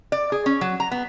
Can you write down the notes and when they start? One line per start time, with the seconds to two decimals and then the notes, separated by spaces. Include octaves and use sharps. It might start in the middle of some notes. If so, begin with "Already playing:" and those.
0.12 D5
0.32 G#4
0.46 C#4
0.61 F#3
0.80 A#5
0.91 B3